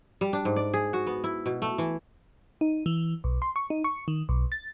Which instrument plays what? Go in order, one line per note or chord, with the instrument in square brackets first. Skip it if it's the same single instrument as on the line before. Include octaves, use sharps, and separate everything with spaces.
[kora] G3
D4
G#2
D5
G#4
F#4
B3
E4
B2
A3
E3
[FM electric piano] D#4
E3
B1
C6
C#6
D#4
C#6
D#3
B1
A6